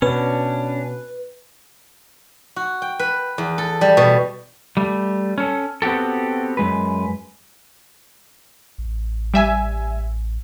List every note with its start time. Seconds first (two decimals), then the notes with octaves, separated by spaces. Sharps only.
0.02 B2 C#4 D4 B4
2.56 F#4
2.82 G5
2.99 B4
3.38 E2
3.58 A4
3.81 G3
3.97 B2
4.77 G3 A3
5.38 C#4 A4
5.82 B3 C4 F#4 G4 A4
6.57 F#2 G#3 B4
8.78 A1
9.34 G3 E5 G#5